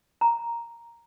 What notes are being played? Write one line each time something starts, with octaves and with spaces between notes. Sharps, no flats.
A#5